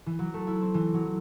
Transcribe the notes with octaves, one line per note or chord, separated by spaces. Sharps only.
E3
F#3
A3
E4
C4
E3
F#3